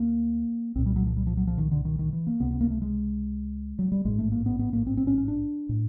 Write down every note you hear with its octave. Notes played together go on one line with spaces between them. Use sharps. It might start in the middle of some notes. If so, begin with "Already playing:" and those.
Already playing: D2 A#3
C2 A#2 C4
G3
F#3
F3
G3
F3
F#3
F3
D#3
D3
D#3
D#3
E3
A#3
C#2 C3 B3
B3
A#3
A3
G#3
F#3
G3
A1 G#2 G#3
A3
A#3
B3
B3
A#3
C4
C4
C#4
C#4
D4
A2